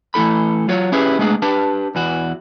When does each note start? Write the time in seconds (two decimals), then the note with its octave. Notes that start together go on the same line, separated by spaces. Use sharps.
0.14 E3 A3 E4 A4 B5
0.68 F#3 F4 F#4 C#5
0.92 C#4 E4 G4 G#4 B4
1.19 G#3 A3 B3 D4 G#4
1.42 D4 G4 B4 A5
1.95 E2 E3 F#4